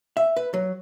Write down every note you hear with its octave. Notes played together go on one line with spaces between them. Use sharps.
E5
B4
F#3